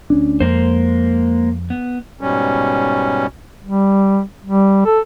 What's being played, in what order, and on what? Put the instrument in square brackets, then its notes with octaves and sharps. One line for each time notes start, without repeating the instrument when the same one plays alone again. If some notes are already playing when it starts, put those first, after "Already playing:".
[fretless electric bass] D2 C#4 D4
[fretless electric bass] F2 [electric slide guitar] G#3 A#3 C5
[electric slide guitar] B3
[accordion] G#2 B2 G3 C#4
[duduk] G3
G3
A4